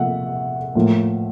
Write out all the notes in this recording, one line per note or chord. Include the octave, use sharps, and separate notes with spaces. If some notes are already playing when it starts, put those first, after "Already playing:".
Already playing: C3 F3 A#3 E5 F#5
A2 F3 A#3